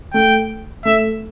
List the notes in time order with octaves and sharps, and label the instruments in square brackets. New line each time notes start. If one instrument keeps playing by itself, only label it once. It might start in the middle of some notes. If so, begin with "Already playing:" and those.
[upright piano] A3 [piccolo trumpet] G5
[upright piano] A3 [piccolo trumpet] E5